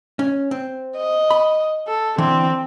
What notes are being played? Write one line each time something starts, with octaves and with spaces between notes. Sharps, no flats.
C#4
C4
D#5
B5
A4
D3 E3 C4